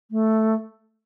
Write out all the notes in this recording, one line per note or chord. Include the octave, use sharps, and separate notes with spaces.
A3